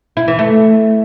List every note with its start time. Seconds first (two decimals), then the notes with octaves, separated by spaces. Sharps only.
0.17 E4
0.28 E3
0.39 A3